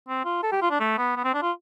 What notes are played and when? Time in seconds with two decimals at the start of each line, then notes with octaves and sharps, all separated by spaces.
0.08 C4
0.25 F4
0.43 A4
0.52 G4
0.62 F4
0.71 D4
0.80 A3
0.98 B3
1.16 B3
1.24 C4
1.34 D4
1.42 F4